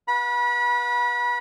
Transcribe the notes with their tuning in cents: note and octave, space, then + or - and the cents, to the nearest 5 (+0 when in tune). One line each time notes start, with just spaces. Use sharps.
B4 -25 F#5 -45 B5 -30